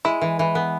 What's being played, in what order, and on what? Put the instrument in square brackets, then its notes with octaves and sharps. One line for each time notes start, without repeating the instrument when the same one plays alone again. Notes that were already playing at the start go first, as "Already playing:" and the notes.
[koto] G#3 [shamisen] E4
[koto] E3
E3
B3